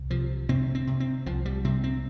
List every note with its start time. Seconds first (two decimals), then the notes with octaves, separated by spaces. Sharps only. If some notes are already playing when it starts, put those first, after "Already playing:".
Already playing: C2
0.11 C3 F3
0.49 C3 C4
0.75 C4
0.87 C3
1.00 C4
1.26 C2 F3
1.45 G3
1.65 C3 C4
1.84 C4